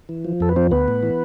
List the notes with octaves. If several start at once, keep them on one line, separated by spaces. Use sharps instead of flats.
E3
F3
F2 A4
B4
F3 C4 C5
D2 B3 B4
A2
E3